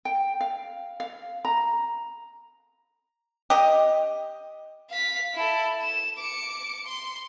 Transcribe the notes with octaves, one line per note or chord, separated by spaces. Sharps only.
G5
F5
F5
A#5
G4 D#5
F5 B6
E4 A4
E7
D6 C#7
C6